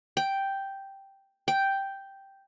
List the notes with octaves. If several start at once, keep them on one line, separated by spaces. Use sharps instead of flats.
G5
G5